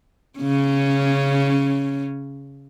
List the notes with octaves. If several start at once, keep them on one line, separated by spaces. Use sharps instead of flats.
C#3 C#4